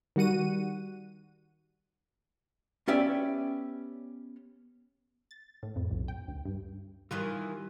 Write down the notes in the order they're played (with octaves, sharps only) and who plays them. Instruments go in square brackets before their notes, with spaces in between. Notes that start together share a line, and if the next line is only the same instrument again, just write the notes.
[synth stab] D#3 G3 F#4 F#5 D#7
[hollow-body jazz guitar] B3 C#4 G4 D5 E5
[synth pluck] A6
A2
F2
B1
G5
D2
G2
[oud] D#3 E3 F4 [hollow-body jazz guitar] G3